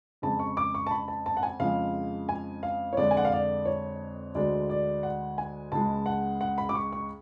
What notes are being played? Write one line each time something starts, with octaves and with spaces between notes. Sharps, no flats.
F2 C#3 G#3 A5
C#6
D6
C#6
A5
B5
A5
A5
F#5
G#5
F2 C#3 F3 G#3 F5
G#5
F5
C#5
F2 D3 G#3 D5
G#5
F#5
F5
D5
C#5
D2 D3 G#3 D5
D5
F#5
G#5
C#2 C#3 G#3 A5
F#5
F#5
B5
D6
C#6
C#6